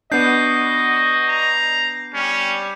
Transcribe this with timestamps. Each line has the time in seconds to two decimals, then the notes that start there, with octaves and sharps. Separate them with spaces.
0.12 B3 D4 F#4 D5 D#5 G6 C7
1.28 A#5
2.14 G3 C#4